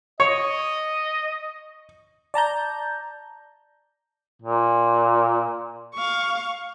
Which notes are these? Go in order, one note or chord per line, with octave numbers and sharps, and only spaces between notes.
C#5 D#5
D5 A5 A#5 G6
A#2
F5 C#6